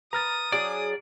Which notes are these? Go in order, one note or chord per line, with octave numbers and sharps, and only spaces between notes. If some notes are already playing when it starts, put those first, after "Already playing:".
B4 A#5 D#6 F6 A6
F#3 D4 G#4 D5